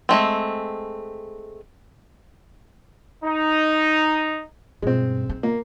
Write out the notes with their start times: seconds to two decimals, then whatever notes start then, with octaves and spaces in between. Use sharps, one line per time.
0.09 G#3 A3 C4
3.24 D#4
4.82 G2 B2 G#3 C4
5.29 D#4
5.43 A#3